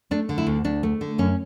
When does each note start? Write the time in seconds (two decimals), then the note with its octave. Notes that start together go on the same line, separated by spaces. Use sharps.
0.11 A3 D4
0.29 D3
0.38 E4
0.47 D2
0.64 D2 D4
0.83 A3
1.01 D3
1.18 F#2 C#4